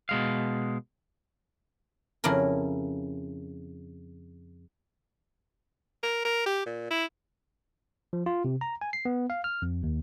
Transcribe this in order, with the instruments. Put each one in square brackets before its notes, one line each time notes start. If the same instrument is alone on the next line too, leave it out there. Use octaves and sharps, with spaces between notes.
[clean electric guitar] B2 G#3 F5
[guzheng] F2 C#3 E4 A#4
[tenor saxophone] A#4
A#4
G4
A#2
E4
[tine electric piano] F3
F4
C3
A#5
G#5
C7
B3
F5
F6
F2
D#2